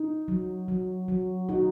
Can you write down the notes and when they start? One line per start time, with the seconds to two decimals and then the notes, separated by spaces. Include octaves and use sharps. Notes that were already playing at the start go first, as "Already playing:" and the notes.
Already playing: D#4
0.28 F#3
0.68 F#3
1.08 F#3
1.48 D#4 F#4